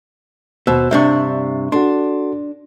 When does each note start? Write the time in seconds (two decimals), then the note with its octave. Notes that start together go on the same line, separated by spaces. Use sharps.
0.67 D#2 B2 C5 E6
0.91 G2 C3 D4 E5 C#6
1.72 D4 F#4 A4 C6